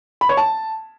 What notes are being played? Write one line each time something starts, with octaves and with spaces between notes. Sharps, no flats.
B5
C#5
A5